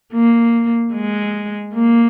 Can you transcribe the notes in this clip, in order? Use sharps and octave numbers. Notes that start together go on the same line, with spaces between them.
A#3
G#3
A#3